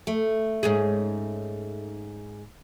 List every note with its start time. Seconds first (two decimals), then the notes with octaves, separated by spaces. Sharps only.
0.07 A3
0.63 G#2 C#4 G#4